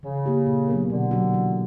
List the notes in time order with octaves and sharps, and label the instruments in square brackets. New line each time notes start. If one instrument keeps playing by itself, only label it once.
[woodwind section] C#3 [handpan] E3
[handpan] A#3 E4 G4
A#2
F#3 B3 D4 A#4
[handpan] B2 [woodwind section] D3
[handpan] F#3 C#4 F#4
E3